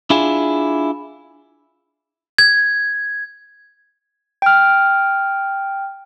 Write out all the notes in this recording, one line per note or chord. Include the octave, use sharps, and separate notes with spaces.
D4 E4 F4 G#4
G#6
G5 F6